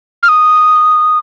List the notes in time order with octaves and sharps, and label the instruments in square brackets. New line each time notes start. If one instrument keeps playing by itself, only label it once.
[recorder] F6
D#6